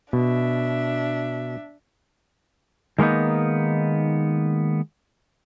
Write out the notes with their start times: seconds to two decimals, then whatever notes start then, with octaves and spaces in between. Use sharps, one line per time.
0.13 B2 D4 E5
2.98 D#3 G#3 A#3 B3 D#4